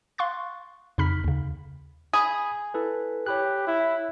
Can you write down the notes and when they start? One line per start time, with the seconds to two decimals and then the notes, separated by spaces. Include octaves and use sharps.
0.18 F5 C6 C#6 F#6 A6
0.98 F2 C#3 D#4 B5 F6 B6
1.24 D#2 C#3
2.13 G#4 B5 D#6
2.74 E4 A4 B4
3.26 G4 C#5 B5 F#6
3.67 E4